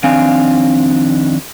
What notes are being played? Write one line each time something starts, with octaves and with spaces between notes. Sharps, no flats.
F2 D#3 C4 D4 F5 G#5